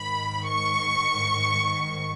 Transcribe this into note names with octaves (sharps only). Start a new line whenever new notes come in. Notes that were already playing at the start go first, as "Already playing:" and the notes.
Already playing: G#2 D#3 B5
C#6